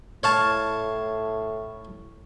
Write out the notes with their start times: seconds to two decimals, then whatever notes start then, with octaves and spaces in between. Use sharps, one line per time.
0.23 A2 C#5 F5 A5